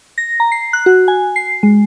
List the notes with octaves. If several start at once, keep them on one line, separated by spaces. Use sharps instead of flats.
A#6
A#5
C7
F#6
F#4
G#5
C7
G#3